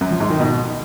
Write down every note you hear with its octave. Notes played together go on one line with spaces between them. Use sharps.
F#2
F3
G#2
D#3
B2